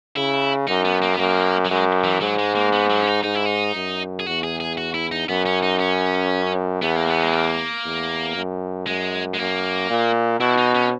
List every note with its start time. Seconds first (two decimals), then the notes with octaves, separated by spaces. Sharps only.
0.16 C#3 E4
0.68 F#2 D#4
0.85 B3
1.02 A#3
1.14 B3
1.18 F#2 A#3
1.65 F#3
1.70 F#2 G#3
2.04 E3
2.21 G#2 F#3
2.39 G#3
2.55 A#3
2.73 B3
2.90 F#3
3.00 C#4
3.07 D#4
3.24 G#2 D#4
3.35 E4
3.46 D#4
3.75 F#2
4.20 G#4
4.27 E2 F#4
4.44 G#4
4.60 G#4
4.78 F#4
4.94 E4
5.12 D#4
5.28 F#2 B3
5.46 C#4
5.63 D#4
5.80 C#4
6.82 E2 B3
6.96 A#3
7.10 B3
7.23 G#3
7.33 A#3
7.85 E2
8.36 F#2
8.87 F#2 G#3
9.34 G#3
9.38 F#2 A#3
9.90 A#2
10.40 B2 E4
10.58 D#4
10.75 C#4